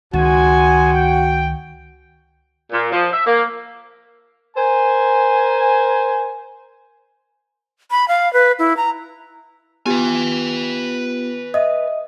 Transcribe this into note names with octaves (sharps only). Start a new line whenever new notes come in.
C#2 D#3 G#3 F#4 C5 G#5
G5
A#2
F3
E5
A#3
A#4 C5 G#5
B5
F5
B4
E4
A#5
B3 F4 G4 B4 G#5
D#5 E5 D#6